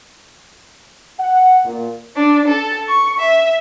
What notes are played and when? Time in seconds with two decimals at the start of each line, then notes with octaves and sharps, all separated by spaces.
1.19 F#5
1.65 A#2
2.16 D4
2.47 A4
2.88 C#6
3.20 E5